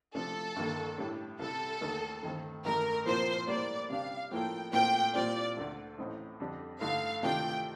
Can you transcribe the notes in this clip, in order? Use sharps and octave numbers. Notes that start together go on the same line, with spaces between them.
C3 F3 A3 D4 F4 A4
G1 G2 D#3 A#3
A2 G3 D4
C2 C3 G3 A4
D#2 D3 A3 D#4 A#4
G2 D#3 A3 C4
A1 G2 D#3 A3 A#4
A#2 F3 C4 F4 A#4 C5
A2 G3 A#3 D5
C3 G3 D4 G4 F5
A2 F3 A#3 F4 A4 G5
A#2 A3 C4 F4 A#4 G5
A#2 G3 C4 F4 D5
D2 D3 A3
A1 A2 A3 C4 D#4
F2 D3 G3 D4
G2 D3 A3 D#4 F5
C3 D#3 A3 D4 F4 G5